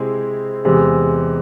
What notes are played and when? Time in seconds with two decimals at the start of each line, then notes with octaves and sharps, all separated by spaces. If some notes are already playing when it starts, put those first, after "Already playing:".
Already playing: C3 G#3 C4 E4 G#4
0.65 E2 C3 G#3